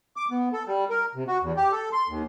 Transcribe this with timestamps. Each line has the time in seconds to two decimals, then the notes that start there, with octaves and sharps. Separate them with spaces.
0.16 D6
0.31 B3
0.53 A4
0.67 G3
0.90 A#4
1.15 C3
1.28 F#4
1.42 E2
1.57 G4
1.72 A4
1.93 C6
2.08 D#2